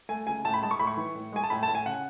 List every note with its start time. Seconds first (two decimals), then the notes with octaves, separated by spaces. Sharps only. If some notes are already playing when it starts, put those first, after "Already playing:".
0.09 A3 G#5
0.27 C#2 G#5
0.44 A2 A5
0.54 B5
0.62 G#3 A5
0.71 C#6
0.79 A2 B5
0.87 C#6
0.97 E3
1.15 A2
1.32 G#3 G#5
1.44 A5
1.50 A2 B5
1.63 A5
1.68 A2
1.75 G#5
1.86 C#3 F#5